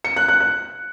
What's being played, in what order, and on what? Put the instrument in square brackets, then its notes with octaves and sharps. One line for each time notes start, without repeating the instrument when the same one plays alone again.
[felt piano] C#7
F#6
F#6
F#6